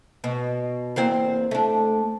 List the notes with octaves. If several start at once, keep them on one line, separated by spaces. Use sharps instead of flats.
B2
E2 A#3 C4
A3 D4